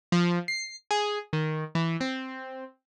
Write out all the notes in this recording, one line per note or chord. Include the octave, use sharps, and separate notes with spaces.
F3
C7
G#4
D#3
E3
C4